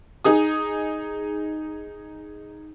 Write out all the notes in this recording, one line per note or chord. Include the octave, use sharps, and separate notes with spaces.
D#4 G#4 D#6